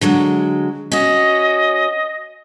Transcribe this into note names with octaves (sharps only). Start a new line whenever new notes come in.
D3 F#3 G#3
C#4 F#4 D#5